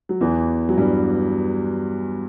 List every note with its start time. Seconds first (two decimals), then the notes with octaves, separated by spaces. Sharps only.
0.09 F#3
0.21 E2 E3
0.69 F#3
0.78 G2 G3